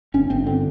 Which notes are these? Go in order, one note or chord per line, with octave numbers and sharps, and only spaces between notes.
G1 C#4
G1 C4
D3 C4